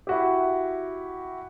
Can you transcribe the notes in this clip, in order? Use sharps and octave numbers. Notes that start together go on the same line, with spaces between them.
E4 F#4 G4